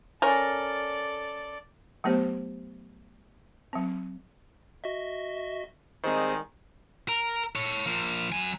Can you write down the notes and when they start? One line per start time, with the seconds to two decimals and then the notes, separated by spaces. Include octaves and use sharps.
0.22 C#4 A4 A#4 D5
2.04 F#3 A3 B3 G4 C5
3.73 F#3 C4
4.84 F#4 D#5 E5
6.04 D#3 G3 G#3 C4 G#4 C5
7.09 A#4
7.55 A4 C#5
7.86 F3 A#3
8.32 F#3 G#5